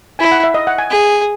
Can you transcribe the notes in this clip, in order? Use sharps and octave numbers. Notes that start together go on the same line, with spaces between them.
E4 G#5
F#5
E5
D#5
F#5
G#5
G#4